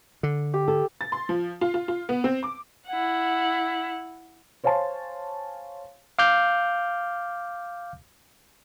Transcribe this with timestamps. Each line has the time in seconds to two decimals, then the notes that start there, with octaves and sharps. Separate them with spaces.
0.23 D3
0.54 G4
0.68 A4
1.01 A6
1.12 C6
1.29 F3
1.61 F4
1.74 F4
1.88 F4
2.09 B3
2.24 C4
2.43 D6
2.87 E4 F#5
4.64 C5 C#5 F5 G#5 A5 C6
6.19 F5 D6 F6 G6